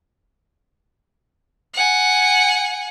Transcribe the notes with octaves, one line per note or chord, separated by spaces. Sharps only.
F#5 G#5